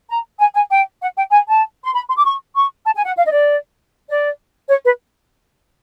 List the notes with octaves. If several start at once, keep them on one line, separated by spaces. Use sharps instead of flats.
A#5
G#5
G#5
G5
F#5
G5
G#5
A5
C6
B5
C6
D6
C#6
C#6
A5
G#5
F#5
F5
D#5
D5
D5
C#5
B4